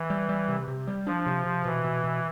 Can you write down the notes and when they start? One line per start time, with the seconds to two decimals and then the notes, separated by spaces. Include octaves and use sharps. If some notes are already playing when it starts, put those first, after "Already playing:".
Already playing: E3
0.10 G3
0.29 G3
0.48 C3
0.68 C3
0.87 G3
1.07 F3 D4
1.26 C3
1.46 C3
1.65 B2 E3
1.84 B2
2.04 B2